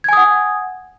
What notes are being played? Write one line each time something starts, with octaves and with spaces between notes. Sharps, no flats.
F#5 G#5 D#6 G#6